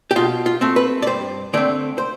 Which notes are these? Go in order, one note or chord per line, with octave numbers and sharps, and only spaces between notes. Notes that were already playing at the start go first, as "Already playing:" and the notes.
G4
B2 F4
F4
A3 C4
B4
D5
G2 C5
D3 A3 C4 D5
C5